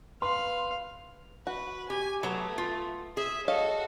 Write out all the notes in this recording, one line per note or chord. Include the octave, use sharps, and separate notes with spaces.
B4 F5 C6
F#4 B4
G4 G#5
F#3 A3 B3 A#5
F4
G#4 E5
F#4 A4 C#5 D#5 F5